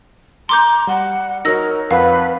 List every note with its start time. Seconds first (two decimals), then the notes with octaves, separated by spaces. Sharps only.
0.49 A#5 C6 D6 G6
0.87 G3 F#5
1.45 D#4 F#4 A#4 C#5 E6 A#6
1.91 F2 C4 B4 F5 F#5